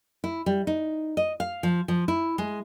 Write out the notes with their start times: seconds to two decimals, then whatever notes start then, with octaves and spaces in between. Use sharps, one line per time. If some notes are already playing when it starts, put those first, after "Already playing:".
0.24 E4
0.46 G3
0.67 D#4
1.17 D#5
1.40 F5
1.63 F3
1.88 F3
2.08 E4
2.38 G#3